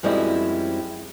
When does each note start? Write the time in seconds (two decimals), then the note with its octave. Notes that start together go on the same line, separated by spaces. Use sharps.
0.03 F#2 F3 G3 G#3 C4 E4